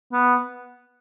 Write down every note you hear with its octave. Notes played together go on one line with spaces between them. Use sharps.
B3